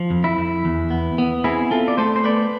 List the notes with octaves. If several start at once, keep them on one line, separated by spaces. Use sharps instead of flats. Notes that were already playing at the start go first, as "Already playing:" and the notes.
Already playing: F3
F2
E4
F2
E2
B3
B3
C4 E4 G#4
C4 F4 A4
D5
A3 A4 C5
C5
B3 B4 D5